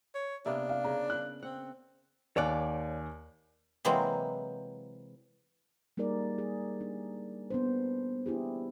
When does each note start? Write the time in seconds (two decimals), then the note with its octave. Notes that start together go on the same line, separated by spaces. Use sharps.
0.15 C#5
0.46 C3 A#3 B3 D4
0.69 F5
0.84 C#3 A#5
1.10 F#6
1.43 C4 F#5
2.37 D#2 C#5 D5 G#5 F#6
3.85 C3 E3 F#3 G#3 A#3 C4
5.97 G3 A#3 D#4 G#4 A#4 D5
6.38 G#4
6.81 D4
7.50 B3 D4 C5
8.26 D4 E4 G4 G#4